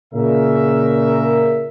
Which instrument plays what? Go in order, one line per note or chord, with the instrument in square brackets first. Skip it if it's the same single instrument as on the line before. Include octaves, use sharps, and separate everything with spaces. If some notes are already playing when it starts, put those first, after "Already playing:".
[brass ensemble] A#2 C#3 A#4 E5